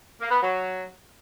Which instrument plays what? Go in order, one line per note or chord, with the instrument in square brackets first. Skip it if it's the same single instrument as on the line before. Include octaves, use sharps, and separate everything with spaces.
[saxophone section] A#3
B3
F#3